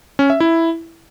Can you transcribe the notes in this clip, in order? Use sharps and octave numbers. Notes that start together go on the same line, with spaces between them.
C#4
E5
E4